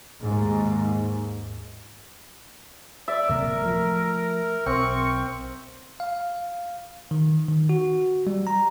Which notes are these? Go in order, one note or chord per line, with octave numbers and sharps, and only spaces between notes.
D#2 G#2
D5 E5
D1 C3 A#3 A#4
F3 A3
B1 C4 A#4 C#6
F5
D#3
D#3
F#4
G3
A#5